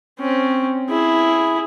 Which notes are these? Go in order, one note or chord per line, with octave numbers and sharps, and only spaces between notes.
C4 C#4
E4 G#4